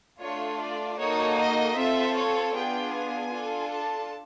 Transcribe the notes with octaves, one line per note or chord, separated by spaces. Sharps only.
A3 D4 F4 C#5
D5
A#3 D#4 F#4 A4 C#5
D#5
C4 F4 A4 E5
C#5
B3 D4 F4 G#4 G5
G#5
D4 F4 A4
A5